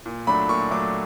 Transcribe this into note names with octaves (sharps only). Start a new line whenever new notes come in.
A#2
F#3 A3 D4 B5
A#2 C#6
F#3 A3 D4 D6